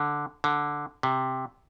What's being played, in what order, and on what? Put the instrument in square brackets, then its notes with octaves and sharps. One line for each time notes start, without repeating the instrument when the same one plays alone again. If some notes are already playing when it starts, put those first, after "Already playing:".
Already playing: [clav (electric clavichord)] D3
D3
C3